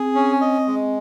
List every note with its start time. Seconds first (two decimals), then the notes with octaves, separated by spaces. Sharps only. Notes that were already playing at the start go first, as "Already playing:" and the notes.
Already playing: C4 G#4
0.15 C#4
0.41 D#5
0.67 G#3